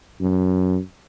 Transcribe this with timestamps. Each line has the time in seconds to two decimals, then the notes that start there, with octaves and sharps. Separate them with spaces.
0.20 F#2